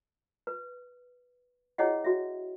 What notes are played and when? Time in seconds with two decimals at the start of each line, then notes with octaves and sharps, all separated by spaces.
0.47 B4
1.78 E4 G#4 C#5 D#5 F#5 G5
2.04 F#4 E5